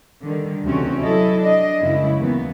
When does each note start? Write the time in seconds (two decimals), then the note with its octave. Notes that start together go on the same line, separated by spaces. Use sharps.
0.23 D3 D#3 G3
0.66 D2 C3 E3 C4 C#4 F#4
1.00 F#3 E4 A4 D#5
1.40 D4 D#5
1.81 F#2 C#3 G#3 E4
2.20 D#2 E3 B3